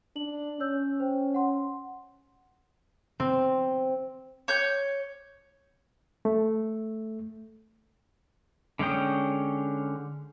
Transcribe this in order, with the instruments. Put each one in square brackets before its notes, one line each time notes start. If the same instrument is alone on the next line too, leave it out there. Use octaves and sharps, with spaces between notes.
[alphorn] D4 [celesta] F#7
[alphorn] C#4 [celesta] C#5 E6 G6
[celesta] C5 G5
F#5 C6
[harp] C4
[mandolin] C#5 G6
[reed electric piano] A3
[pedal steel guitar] D3 G#3 C#4 G5 D#6